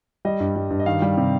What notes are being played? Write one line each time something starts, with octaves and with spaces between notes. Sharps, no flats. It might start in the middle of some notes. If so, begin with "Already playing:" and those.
G3 D#5
G2
G3
G2
D#5
D#3 F5
G3
C3